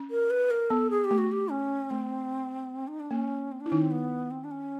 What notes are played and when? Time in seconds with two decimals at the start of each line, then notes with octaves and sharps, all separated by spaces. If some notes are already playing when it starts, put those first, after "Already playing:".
Already playing: C#4
0.11 A#4
0.30 B4
0.51 A#4
0.70 B3 A4
0.90 G#4
1.05 G4
1.11 A3
1.18 F#4
1.32 G4
1.51 C#4
1.90 A3 C4
2.88 D#4
3.00 D4
3.11 A#3 C#4
3.52 C4
3.61 D4
3.66 E4
3.71 D#3 C#4 D#4
3.81 C4
3.91 B3
4.31 C4
4.44 D4
4.51 C#4